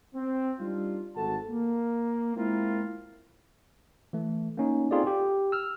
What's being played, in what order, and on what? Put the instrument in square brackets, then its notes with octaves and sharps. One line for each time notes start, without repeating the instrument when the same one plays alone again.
[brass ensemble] C4
G3 D4 D#4 F4
G#1 D#3 F#4 A4 A5
A#3
G#3 A#3 C4 E4 F4 A#4
[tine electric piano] E3 A3
A#3 C#4 D#4
C4 D#4 F4 G#4 A4 D5
G4
E6 F6